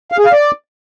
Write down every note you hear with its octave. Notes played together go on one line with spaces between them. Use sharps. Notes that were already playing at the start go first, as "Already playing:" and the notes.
F5
G#4
F5
D5